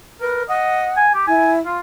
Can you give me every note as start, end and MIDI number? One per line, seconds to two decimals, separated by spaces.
0.21 0.43 70
0.21 0.43 71
0.49 0.88 75
0.49 1.05 78
0.96 1.13 80
1.14 1.23 67
1.27 1.61 64
1.27 1.52 80
1.65 1.78 65